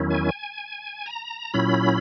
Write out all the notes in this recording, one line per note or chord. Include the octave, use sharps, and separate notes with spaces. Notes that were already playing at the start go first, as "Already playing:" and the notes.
Already playing: E2 D#3 F#3 C#4 E4
G#5
A#5
A#2 F#3 C#4 E4 B5